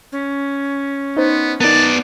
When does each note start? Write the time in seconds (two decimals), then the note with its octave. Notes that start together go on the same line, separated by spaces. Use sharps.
0.12 C#4
1.17 B3 D#4 C5
1.61 B3 D#4 A#4 D5 A5